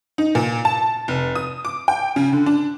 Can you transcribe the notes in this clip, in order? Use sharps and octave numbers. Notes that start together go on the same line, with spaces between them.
D#4
A#2
A5
F1
D#6
D6
G5
C#3
D3
D4